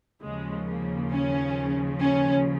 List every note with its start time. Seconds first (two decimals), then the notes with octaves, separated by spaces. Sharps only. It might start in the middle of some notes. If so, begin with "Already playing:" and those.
0.22 D#2 C#3 F3 G#3
0.67 A#3
1.12 C#4
2.01 C#4